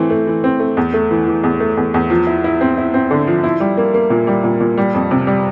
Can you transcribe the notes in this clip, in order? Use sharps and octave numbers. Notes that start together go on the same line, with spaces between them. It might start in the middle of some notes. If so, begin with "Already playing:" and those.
Already playing: E3 A3 C4
A3
E3
C4
A3
E2
A3
E3
E3
E2
A3
E2
E2
F3
E4
E4
C4
E4
C4
D3
F3
E4
G3
A#3
A#3
A#2
G3
A#2
A#2
G3
F2
C3
G3